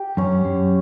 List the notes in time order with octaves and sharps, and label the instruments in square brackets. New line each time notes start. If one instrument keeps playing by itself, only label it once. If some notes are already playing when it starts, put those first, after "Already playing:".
Already playing: [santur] G4
[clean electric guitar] F#2 [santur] C#4
[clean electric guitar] F#2